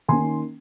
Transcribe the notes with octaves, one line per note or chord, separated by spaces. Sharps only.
D#3 A#3 C#4 G#5 C6